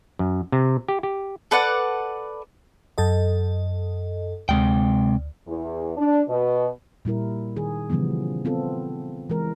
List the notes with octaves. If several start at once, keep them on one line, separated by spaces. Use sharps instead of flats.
F#2
C3
G4
G4
A4 B4 D5 F#5
F#2 A4 D#5
D2 C3 G#3 G5
E2
D4
B2
A#2 G3 E4 A#4
D#3 G#4
C#3 E3 F3 G3 B3
B3 C4 F4 A4
E3 G#3 A#4